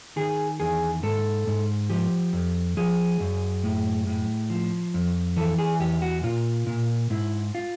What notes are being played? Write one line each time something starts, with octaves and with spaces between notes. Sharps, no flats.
D#3 G#4
E2 G#4
G#2 A4
G#2
F3 G4
F2
F3 G#4
F#2
A2
A2
F3
F2
E3 A4
G#4
E2 G4
F#4
A#2 F4
A#2
G#2 E4
F4